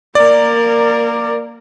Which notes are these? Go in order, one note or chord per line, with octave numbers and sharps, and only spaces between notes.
A#3 A#4 D5